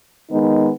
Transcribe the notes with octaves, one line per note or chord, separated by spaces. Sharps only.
D#3 G#3 B3 D#4